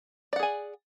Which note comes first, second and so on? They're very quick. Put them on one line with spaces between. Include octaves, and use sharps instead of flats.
D5 F#5 G#4 G#5